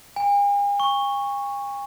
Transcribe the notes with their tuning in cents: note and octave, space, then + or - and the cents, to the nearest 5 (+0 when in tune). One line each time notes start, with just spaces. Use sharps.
G#5 -45
C#6 -5